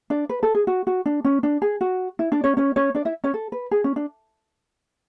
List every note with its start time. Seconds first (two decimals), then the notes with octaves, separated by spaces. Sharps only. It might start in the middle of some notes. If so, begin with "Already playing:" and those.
0.10 D4 D5
0.29 B4
0.43 A4
0.55 G#4
0.67 F#4
0.87 F#4
1.06 D4
1.25 C#4
1.43 D4
1.62 G#4
1.81 F#4
2.19 E4
2.32 D4 D5
2.44 C#4 C#5
2.57 C#4 C#5
2.76 C#4 C#5
2.95 D4 D5
3.05 E4 E5
3.24 C#4 C#5
3.34 A4
3.52 B4
3.71 G#4
3.84 C#4
3.96 D4